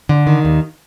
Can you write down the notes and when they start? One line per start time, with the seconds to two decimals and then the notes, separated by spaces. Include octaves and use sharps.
0.09 D3
0.27 D#3
0.45 D#2